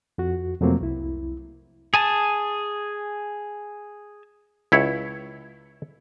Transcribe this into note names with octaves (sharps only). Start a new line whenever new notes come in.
F2 F#4
F2 C3 F#3 A3 A#3 C4
C2 E4
G#4 G#5 A5
C#2 E4 C#5